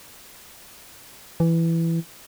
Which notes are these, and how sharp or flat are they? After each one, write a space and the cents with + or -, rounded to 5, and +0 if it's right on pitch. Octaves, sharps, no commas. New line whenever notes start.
E3 +10